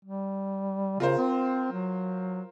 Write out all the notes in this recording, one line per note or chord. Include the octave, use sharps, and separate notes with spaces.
G3
C#3 F4 A#4 C5
C4
F#3